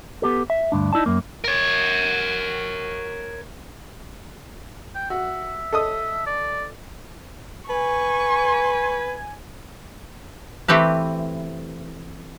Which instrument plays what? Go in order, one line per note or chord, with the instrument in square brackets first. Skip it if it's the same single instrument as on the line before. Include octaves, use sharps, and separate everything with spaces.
[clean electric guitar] B3 G4 A4
E5
D2 G2 D4
D#4 E4 D5 A5
F#2 A#3
[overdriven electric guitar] A#4 C#5
[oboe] G5
[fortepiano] F#4 [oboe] E5
[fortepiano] A4 D#5 D#6
[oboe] D5
[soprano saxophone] B4 [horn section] G#5 [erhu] C#6
[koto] E3 A3 C4 G4 B4